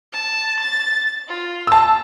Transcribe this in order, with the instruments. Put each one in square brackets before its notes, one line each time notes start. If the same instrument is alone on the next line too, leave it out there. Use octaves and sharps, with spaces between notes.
[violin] A5
A6
F4
[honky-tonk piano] A5 E6